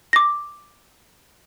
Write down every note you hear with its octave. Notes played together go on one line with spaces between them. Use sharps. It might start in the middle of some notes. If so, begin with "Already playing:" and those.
D6 A#6